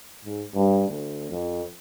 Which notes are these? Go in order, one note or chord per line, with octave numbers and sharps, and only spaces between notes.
G#2
G2
D2
F2